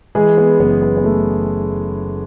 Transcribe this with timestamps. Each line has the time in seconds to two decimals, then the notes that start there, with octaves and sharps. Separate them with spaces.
0.15 E3 G#3 G#4
0.38 B3
0.59 F#1 B3
0.82 B3
0.97 B3
1.04 A3